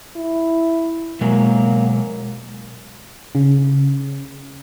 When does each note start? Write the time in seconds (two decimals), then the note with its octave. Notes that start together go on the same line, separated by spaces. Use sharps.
0.16 E4
1.21 B2 F#3 G#3 A#3
3.35 C#3